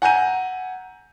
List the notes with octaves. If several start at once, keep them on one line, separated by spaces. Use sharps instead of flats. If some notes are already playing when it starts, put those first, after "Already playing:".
F#5 G#5 A#5 G6 D#7